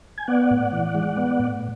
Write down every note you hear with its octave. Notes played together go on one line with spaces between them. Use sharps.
G#5
B3 D5 F#5
A2
E3
G#3
B3
A2